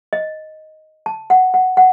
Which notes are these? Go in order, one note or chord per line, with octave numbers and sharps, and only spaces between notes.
D#5
A5
F#5
F#5
F#5